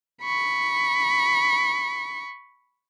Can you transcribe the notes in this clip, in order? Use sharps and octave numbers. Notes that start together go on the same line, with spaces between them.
B5 C#6